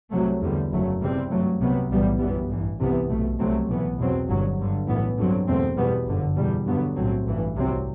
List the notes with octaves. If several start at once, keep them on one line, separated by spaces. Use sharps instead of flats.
C2 C3 F#3 A3
E2 D3 G3
F#1 F#2 F#3 A3
E2 C3 G3 C4
G2 F#3 A3
C2 C3 F#3 B3
B1 A2 E3 G3 B3
G1 F#2 E3 G3 B3
A1 G2 E3
C2 C3 E3 B3
B1 B2 A3
C2 C3 F#3 A3 C4
B1 A2 E3 B3
E2 B2 F#3 C4
G1 G2 F#3
G1 G2 D3
B1 A2 E3 B3
G2 D3 F#3 C4
E2 B2 A3 C4
E2 B2 G3 B3
G1 F#2 D3
E2 B2 G3
G2 D3 F#3 B3
B1 A2 F#3 A3 C4
A1 G2 E3
C2 C3 F#3 C4